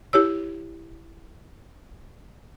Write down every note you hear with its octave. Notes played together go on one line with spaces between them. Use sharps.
E4 G4 C#5 E6